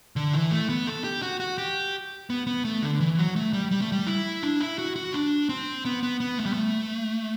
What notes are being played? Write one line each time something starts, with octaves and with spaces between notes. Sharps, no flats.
D3
E3
A3
B3
A4
G4
F#4
F#4
G4
B3
B3
A3
D3
E3
F#3
A3
G3
G3
A3
G3
E4
D4
E4
F#4
F#4
D4
C4
B3
B3
B3
A3
G3
A3